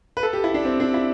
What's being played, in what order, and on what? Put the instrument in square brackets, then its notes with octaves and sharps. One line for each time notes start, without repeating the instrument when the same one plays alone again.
[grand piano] B4
A4
G4
E4
D4
C4
D4
E4